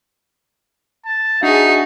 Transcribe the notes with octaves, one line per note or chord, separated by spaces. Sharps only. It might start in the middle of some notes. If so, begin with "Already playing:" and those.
A5
D4 D#4 F#4 G#4 E5 C7